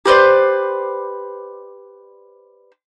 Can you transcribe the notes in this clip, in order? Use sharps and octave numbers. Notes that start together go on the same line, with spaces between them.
G4 B4 C5 D5